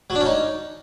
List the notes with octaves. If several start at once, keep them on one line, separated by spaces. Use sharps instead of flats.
F#3
D4
C#4
D#4